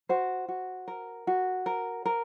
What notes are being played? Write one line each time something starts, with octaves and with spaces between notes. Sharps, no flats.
F#4 C5
F#4
A#4
F#4
A#4
A#4